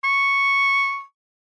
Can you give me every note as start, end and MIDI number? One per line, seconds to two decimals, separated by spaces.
0.04 1.02 85